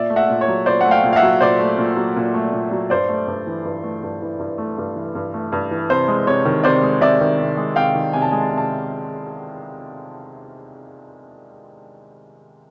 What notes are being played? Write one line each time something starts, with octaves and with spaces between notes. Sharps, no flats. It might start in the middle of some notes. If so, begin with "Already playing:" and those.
Already playing: A#2 D5 E5
A3
E5 F#5
A#2
C#5
F#3
A#2 C5 D5
A3 F#5
F5 G5
A#2
F5
E5 F#5
F#3
A#2 C5 D5
A3
A#2
F#3
A#2
A3
A#2
F#3
G2 C5 D5
A3
G2
E3
G2
A3
G2
E3
G2
A3
G2
E3
G2
A3
G2
E3
C3 C5
G#3
C3 C#5
D#3
C3 C5 D5
G#3
C3 D5 E5
D#3
C3
G#3
C3 F5 G5
D#3
C3 G#5
A5
G#3 G#5
A5
C3 G#5
A5